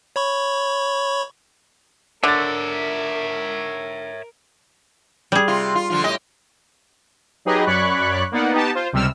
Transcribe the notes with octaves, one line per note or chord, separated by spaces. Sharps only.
C#5 B5 C#6
D3 A#4 C#5 E5 D6 A6
G3 G#4
C3 F4
F4
D3 F3 F4
A2 G4 D#5
F#3 D#4 G4 G#4 B4 D#5
F#2 C#5 D5 B5 C#6 F#6
A#3 B3 D#4 D5 F#5
B3 D#4 G4 A5
F4 C5
C#2 C3 G3 E6 F6